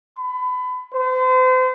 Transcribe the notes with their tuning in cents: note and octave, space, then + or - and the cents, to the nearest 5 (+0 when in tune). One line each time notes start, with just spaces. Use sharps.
B5 +30
C5 -40